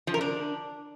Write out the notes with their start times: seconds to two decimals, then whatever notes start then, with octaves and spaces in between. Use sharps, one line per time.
0.07 F3
0.14 A#4
0.21 D4